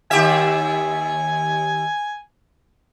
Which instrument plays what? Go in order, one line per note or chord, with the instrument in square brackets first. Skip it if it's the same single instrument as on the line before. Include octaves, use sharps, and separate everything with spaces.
[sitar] D#2 G4 E5 [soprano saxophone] G#5